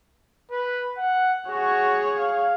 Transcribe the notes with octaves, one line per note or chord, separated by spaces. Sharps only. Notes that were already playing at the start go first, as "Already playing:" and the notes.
B4
F#5
F#4 G#4 C#5
F5